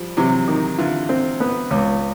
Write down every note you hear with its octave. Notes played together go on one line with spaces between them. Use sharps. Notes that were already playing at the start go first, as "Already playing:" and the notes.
Already playing: F3 G3
C3 E3 F#3
D#3
D3 E3 F4
C4
B3
C#2